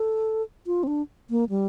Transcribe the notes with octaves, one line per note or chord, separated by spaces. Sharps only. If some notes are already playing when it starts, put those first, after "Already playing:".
Already playing: A4
F4
C4
D4
A#3
G3